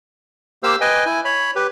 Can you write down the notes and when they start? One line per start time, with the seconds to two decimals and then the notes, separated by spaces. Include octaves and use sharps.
0.63 A#3 G4 C5 F5 E6
0.81 B4 D#5 G5 G#5
1.06 E4 G#5
1.25 C#5 B5
1.56 G4 B4